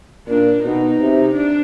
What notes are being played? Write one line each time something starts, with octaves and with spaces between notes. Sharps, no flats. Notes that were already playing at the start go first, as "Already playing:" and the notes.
A#2 D4
B2 D#4
C3
D4